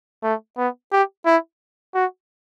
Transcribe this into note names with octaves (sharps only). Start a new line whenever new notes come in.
A3
B3
G4
E4
F#4